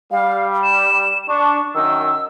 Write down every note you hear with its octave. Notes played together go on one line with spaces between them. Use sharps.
G3 F5
E7
D4 C#6
F#2 D#3 E6